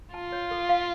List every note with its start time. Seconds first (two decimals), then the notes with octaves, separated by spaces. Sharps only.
0.14 F4 A5
0.32 C#5
0.51 A4
0.69 F5